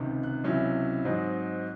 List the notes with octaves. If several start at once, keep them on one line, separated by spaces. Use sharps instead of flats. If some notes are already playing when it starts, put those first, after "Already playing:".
Already playing: C#2 C3 D#3
F#6
C#2 C3 F#3 C#4 E4
G#2 F#3 C4 D#4